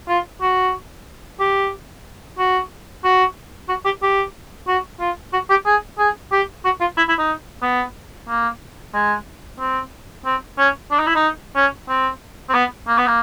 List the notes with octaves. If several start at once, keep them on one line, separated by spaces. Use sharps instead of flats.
F4
F#4
G4
F#4
F#4
F#4
G4
G4
F#4
F4
F#4
G4
G#4
G#4
G4
F#4
F4
E4
E4
D#4
B3
A#3
G#3
C4
C4
C#4
D4
D#4
E4
D#4
C#4
C4
C4
B3
A#3
B3
A#3